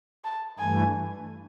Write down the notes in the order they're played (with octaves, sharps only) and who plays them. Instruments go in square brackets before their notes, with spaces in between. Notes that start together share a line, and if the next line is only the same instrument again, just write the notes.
[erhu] A5
[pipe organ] G2 E3 A3 [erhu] G#5